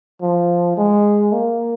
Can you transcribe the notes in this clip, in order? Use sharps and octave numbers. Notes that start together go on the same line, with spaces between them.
F3
G#3
A#3